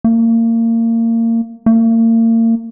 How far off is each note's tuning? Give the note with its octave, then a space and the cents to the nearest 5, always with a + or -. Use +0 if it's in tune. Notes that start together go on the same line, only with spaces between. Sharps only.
A#3 -30
A#3 -40